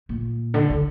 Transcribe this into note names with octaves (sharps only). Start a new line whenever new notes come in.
A#2
D3
D3